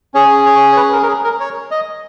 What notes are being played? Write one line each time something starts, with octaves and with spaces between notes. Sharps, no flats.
C#4 G#4 C#5
C#5
C#5
B4
A#4
A#4
G#4
A#4
C#5
D#5